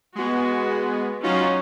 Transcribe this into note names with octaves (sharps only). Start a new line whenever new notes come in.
G#3 B3 F#4
F#3 C#4 D#4 F4 F#4